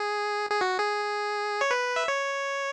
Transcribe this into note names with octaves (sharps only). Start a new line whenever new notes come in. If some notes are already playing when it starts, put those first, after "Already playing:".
Already playing: G#4
G#4
F#4
G#4
C#5
B4
E5
C#5